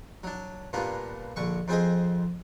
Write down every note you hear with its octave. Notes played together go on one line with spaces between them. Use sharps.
F#3 D4
G2 A#2 A#3 B3 D4
A#1 D3 C#6
F2 C4 G#4 C5 D#5